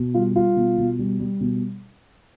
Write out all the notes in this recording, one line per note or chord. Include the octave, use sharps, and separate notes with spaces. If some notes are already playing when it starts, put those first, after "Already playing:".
Already playing: B2
G3 F4
G3 F4
B2
B2
G3
G3
B2